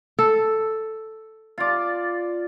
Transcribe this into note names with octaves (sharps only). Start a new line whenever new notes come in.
A4
F4 D5